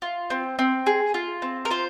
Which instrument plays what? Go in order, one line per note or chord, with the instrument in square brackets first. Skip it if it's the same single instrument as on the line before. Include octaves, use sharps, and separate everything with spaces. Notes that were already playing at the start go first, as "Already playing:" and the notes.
[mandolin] F4
C4
C4
G#4
F4
C4
A#4
F4 C5